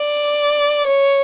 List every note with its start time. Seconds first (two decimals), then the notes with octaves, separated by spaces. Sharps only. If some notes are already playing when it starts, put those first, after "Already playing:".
Already playing: D5
0.87 C#5